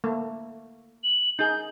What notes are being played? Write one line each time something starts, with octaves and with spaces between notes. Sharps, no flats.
A3 A#3
F#7
D#4 G#4 G6